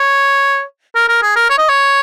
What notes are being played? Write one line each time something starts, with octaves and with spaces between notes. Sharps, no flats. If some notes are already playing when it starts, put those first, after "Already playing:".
Already playing: C#5
A#4
A#4
G#4
A#4
C#5
D#5
C#5